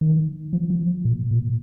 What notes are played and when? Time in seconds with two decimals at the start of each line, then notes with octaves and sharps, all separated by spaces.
0.01 D#3
0.53 F3
0.70 F3
1.05 A#2
1.31 A#2